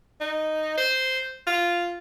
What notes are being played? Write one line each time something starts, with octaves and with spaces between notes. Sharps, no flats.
D#4
C5
F4